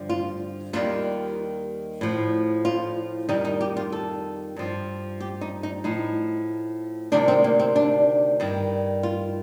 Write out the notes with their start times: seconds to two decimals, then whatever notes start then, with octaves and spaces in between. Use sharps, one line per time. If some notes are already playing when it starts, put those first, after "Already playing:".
Already playing: G2 D3 F3
0.09 F4
0.73 D#2 D#3 G3 F4
2.01 A2 F3
2.65 F4
3.29 F2 D#3 G3 D#4
3.45 D#4
3.61 G4
3.77 F4
3.92 A4
4.56 G2 F3
5.20 G4
5.41 D#4
5.63 D#4
5.84 A2 F3 D#4
7.12 D2 C3 D#3 G3 D4
7.28 C4
7.44 A#3
7.59 C4
7.76 D4
8.40 G2 D#3 G3
9.03 F4